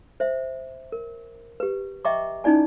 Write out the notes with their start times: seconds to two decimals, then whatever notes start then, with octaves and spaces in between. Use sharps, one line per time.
0.20 C5 E5
0.92 A#4
1.60 G4 B4
2.05 D#5 E5 G5 A#5 C#6 D6
2.44 C#4 D#4 E4 D5 G#5